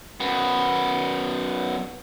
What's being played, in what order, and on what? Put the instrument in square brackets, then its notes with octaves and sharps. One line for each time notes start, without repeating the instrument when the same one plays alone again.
[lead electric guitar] F#2 B3